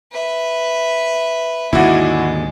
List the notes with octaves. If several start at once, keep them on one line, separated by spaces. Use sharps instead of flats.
B4 E5
D#2 G#2 D3 G#3 E4 F#4